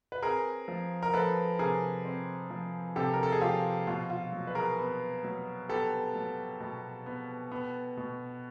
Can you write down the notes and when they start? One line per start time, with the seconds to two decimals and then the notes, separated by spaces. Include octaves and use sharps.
0.12 B4
0.22 C4 G#4 A#4
0.68 F3
1.03 A#4
1.14 F3 A4 B4
1.59 C3 G#4 A#4
2.05 C4
2.50 F3
2.96 C3 G4 A4
3.14 A#4
3.23 A4
3.32 G#4
3.41 F3 F4 G4
3.87 B2 F4
4.10 F4
4.32 F#3
4.47 B4
4.55 G#4 A#4
4.78 B3
5.24 F#3
5.69 B3 G4 A4
6.15 F#3
6.60 B2
7.06 B3
7.51 B3
7.97 B2